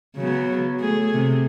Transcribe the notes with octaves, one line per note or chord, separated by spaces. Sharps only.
C#3 F#3 B3
A3 G#4
C3